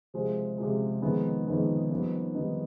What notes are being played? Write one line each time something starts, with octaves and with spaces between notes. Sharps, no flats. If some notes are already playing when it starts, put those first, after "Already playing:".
C3 F3 G#3
C3 F3 G#3
F2 D#3 G#3 B3 D#4
F2 D#3 G#3 B3 D#4
F2 D#3 G3 B3 D#4
F2 D#3 G3 B3 D#4